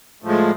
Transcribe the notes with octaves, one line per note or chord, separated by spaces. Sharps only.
A2 F3 G#3